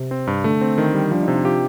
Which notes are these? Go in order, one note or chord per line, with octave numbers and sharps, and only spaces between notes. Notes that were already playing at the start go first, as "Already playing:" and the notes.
Already playing: C3
C4
G2
D3 A3
C4
D#3
G3
F3 D4
D#4
C3
F4
F4 G4